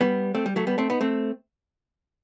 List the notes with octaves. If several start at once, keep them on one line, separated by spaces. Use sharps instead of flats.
G3 B3
A3 C4
G3
F#3 A3
G3 B3
A3 C4
B3 D#4
A3 C4